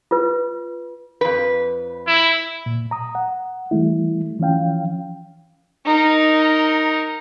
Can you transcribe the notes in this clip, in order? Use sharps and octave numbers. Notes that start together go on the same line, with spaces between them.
F4 B4
F2 B4
E4
A#2
A#5 D#6
F#5
E3 G3 A3 E4
E3 F3 C#4 F5 G5
D#4 A#4